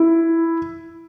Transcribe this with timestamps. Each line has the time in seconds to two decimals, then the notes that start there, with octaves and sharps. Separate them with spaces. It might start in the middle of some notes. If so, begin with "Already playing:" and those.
Already playing: E4